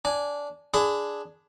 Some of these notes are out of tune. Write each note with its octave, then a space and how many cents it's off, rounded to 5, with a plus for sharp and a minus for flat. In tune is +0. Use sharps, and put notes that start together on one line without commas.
D4 -15 G#5 +0
D4 +0 G#4 +0 B5 +35